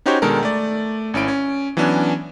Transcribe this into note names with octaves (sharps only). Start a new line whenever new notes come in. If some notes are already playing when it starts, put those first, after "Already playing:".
C#4 D#4 F#4 G4 C5 C#5
B2 D#3 G#3 D4 A4 A#4
A3 D5
G#1 C#4 E4 D7
C#4
E3 F#3 B3 C#4 D4